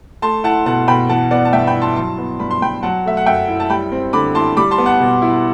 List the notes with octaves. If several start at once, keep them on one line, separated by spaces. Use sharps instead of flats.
A3 A5 C6
E4 F#5 A5
B2 F#5 A5
B2 G5 B5
E3 F#5 A5
B3 D5 F#5
A5
G2 E5 G5
G5 B5
E4
A5 C6
F#3 A5 C6
B3
G2 B5
C6
G2 G5 B5
F#3 F#5 A5
A3 E5
F#5
F#2 E5 G5
E4
A5
G3 G5 B5
C4
D3 B5 D6
E4 A5 C6
G3 B5 D6
A5 C6
B3
F#5 A5
B2
E4